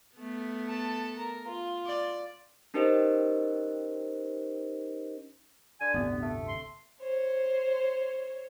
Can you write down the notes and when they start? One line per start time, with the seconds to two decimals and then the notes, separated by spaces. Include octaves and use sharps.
0.16 A3 B3
0.68 A4 A5
1.17 A#4
1.47 F4
1.86 D5
2.74 C#4 D#4 G4 A#4 C5 D#5
5.81 D3 G#5
5.94 D1 G1 C3 B3
6.22 A3
6.48 C6
7.02 C5 C#5